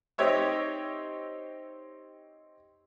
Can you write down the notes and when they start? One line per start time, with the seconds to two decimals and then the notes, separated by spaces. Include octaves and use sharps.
0.18 C4 D#4 G4 C#5 E5